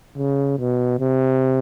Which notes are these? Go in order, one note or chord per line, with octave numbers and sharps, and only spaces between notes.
C#3
B2
C3